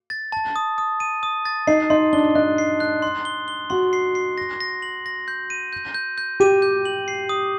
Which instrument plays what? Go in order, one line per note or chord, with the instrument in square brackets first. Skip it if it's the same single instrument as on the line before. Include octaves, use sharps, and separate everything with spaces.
[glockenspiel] A6
A5
D#6
D#6
D#7
D#6
A6
[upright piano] D#4 [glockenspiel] C7
[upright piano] D#4 [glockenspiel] C6
[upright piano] D4 [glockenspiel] G7
[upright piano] D#4 [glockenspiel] F#6
[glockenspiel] C7
F#6
C6
G7
G7
[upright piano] F#4 [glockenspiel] C6
[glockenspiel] C7
C7
A#6
A#6
F#7
A#6
G6
D#7
G6
G6
G6
[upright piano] G4 [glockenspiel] D#7
[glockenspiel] G6
F#7
C7
D#6